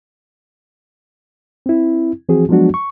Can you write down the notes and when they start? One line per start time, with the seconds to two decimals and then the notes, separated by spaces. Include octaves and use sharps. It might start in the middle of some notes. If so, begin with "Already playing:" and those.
1.66 C4 E4
2.29 E3 F3 C4 F#4 G#4
2.49 F3 F#3 G#3 B3 D4 F#4
2.74 C#6